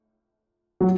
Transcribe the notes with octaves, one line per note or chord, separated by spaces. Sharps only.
F#3